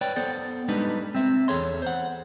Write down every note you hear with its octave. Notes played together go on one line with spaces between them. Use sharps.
B4 C#5 D5 G5
B3 A4 C5 D5
G3 G#3 D4 D#4 B4
C4 E5
E2 G#3 G#4 A4 C#5 C6
C5 F#5